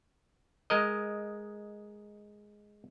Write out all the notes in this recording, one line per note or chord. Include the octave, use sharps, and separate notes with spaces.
G#3 A#4 D#5